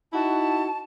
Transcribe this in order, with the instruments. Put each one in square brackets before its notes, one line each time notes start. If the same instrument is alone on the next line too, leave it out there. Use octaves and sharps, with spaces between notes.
[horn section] D#4 E4 F#4 [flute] A5